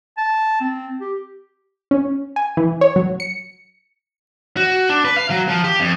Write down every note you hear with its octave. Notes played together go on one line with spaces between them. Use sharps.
A5
C4
G4
C#4
G#5
E3
C#5
F#3
C#7
F#4
D4
B4
F5
F#3
F3
G4
F2